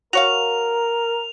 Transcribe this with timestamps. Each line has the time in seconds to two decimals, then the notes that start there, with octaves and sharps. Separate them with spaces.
0.13 F#4 A#4 C#5 F5 F7